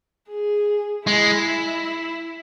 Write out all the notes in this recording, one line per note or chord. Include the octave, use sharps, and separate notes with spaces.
G#4
G#3 E4